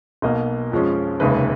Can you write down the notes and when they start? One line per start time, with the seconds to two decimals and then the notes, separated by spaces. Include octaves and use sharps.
0.22 B1 B2 A#3 D#5
0.72 F2 F3 G#3 C#4
1.20 F1 D#2 C#3 G#3 B4